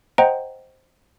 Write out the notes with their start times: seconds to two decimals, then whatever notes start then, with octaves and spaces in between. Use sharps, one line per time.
0.18 C5 D#5 F#5 G5 A#5